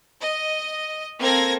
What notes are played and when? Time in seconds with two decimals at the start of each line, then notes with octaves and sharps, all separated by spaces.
0.21 D#5
1.19 A#3 C4 A4 G#6 A#6